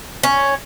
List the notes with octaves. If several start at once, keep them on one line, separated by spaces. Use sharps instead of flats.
C#4